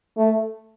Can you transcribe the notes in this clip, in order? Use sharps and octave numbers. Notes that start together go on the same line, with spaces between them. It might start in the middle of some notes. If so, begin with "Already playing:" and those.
A3